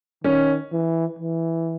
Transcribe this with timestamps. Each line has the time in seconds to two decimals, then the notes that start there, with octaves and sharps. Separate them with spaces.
0.24 D#3 C#4
0.72 E3
1.19 E3